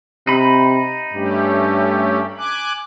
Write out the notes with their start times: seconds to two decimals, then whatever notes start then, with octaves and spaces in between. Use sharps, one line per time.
0.27 C3 D#4 B5
1.14 G2 A3 C#4 G4
2.38 G#5 D6 F#6